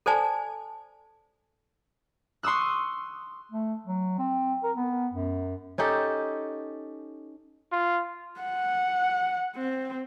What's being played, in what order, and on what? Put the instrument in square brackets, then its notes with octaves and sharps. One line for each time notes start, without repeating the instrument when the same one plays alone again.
[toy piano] A4 C5 D5 G#5 A5
[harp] C6 C#6 D#6 E6 F#6
[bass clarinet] A3
F#3
C4
A#4
B3
F#2
[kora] C#4 D#4 G4 A4
[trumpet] F4
[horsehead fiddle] F#5
C4